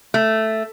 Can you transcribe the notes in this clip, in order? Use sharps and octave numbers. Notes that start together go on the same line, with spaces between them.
A3